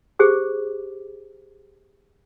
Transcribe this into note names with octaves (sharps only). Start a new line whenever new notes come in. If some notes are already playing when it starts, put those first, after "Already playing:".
G4 G#4 C5 D6